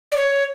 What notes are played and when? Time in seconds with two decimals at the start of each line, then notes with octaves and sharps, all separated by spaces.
0.12 D5
0.17 C#5